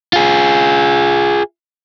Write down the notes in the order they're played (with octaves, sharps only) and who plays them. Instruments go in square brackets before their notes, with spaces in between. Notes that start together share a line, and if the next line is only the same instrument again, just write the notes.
[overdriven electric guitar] F4 G#4